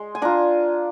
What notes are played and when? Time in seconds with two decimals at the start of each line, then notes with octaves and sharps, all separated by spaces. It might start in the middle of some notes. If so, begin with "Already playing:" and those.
Already playing: G#3 C6
0.15 G#5
0.22 D4 F4 A#5